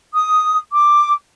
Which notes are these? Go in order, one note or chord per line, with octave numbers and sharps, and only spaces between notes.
D#6
D6